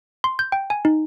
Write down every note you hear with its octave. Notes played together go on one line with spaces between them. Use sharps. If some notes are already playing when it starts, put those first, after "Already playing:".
C6
G6
G5
G#5
D#4